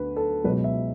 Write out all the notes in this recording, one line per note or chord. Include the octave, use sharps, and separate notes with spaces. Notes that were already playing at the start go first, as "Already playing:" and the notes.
Already playing: D2 D3 B4
A4
C#2 B2 F#3 B4
E5